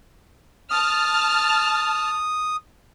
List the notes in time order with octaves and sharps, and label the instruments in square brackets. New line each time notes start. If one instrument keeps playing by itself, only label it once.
[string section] A5 F6 [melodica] D#6